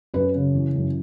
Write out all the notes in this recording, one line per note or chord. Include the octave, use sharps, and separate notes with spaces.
F#2 B4
C#3
E3
F#2